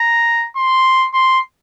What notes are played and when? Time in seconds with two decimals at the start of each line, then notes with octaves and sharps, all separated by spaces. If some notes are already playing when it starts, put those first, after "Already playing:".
Already playing: A#5
0.56 C6
1.13 C6